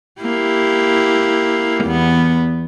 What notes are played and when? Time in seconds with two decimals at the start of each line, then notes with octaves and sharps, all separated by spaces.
0.22 A#3 E4 G4
1.85 E2 B3